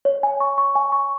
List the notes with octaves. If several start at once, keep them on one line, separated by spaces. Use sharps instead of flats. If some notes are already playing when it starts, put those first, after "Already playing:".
C#5
G#5
C#6
C#6
G#5
C#6